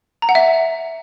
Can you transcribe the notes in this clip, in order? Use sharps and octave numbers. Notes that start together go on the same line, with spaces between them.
A#5
F#5
E5